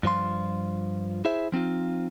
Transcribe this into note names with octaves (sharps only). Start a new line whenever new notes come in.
G2 F3 F4 C6
E4 G#4 C5 E5
F3 C4 D#4 F4